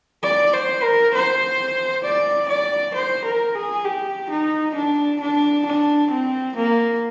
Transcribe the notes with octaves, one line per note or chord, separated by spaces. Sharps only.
D5
C5
A#4
C5
D5
D5
C5
A#4
G#4
G4
D#4
D4
D4
D4
C4
A#3